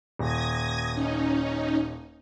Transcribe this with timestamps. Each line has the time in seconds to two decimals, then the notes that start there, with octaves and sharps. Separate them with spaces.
0.19 D#1 D#6 G#6 A#6
0.93 C#4 D#4